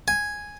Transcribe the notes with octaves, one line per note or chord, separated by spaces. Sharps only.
G#5